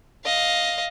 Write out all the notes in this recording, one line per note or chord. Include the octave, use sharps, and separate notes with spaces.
D#5 F5